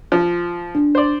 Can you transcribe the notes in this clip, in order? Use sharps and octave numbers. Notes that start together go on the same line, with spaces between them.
F3
D4
C5 D5